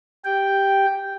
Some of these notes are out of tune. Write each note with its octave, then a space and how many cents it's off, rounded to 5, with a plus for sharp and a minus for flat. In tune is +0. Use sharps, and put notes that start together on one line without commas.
G4 +0 G5 +0